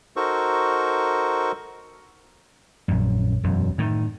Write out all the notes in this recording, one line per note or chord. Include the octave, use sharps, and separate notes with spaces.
D#4 F#4 A4 A#4 C5 C#6
A#1 F#2
E1 F#2
A2 D#3